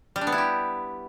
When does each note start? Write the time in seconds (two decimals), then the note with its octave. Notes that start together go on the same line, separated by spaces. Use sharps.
0.16 G3
0.21 D4
0.27 B3
0.32 E4
0.38 G4